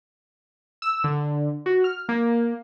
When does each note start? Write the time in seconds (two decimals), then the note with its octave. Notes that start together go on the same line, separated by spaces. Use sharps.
0.82 E6
1.04 D3
1.66 F#4
1.84 F6
2.09 A#3